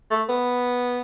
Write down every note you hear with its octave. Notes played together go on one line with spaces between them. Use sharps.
A3
B3